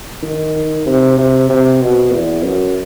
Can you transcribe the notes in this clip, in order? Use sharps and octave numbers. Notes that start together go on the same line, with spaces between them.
D#3
C3
C3
C3
B2
E2
F#2